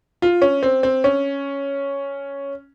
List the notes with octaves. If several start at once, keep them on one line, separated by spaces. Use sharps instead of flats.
F4
C#4
C4
C4
C#4